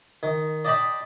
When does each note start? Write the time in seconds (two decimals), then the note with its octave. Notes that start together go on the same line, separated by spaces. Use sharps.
0.23 D#3
0.65 D5 D#5 G5 A5 B5